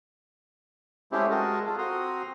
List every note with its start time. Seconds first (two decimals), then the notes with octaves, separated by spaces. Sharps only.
1.12 G#3 A3 C4 C#4 E4 G4
1.31 G#3 F#4 G#4 A#4 D#5 A5
1.66 F4 A4
1.78 C4 F#4 A#5 C6 D#6